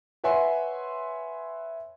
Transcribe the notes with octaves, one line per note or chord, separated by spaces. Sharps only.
B4 C#5 E5 F#5 G#5 C6